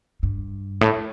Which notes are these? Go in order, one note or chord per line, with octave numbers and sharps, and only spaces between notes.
G2
A2